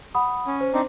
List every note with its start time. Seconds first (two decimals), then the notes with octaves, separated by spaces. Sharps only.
0.15 F#5 B5 D#6
0.47 C#4
0.61 C5
0.73 C4 D4 D#4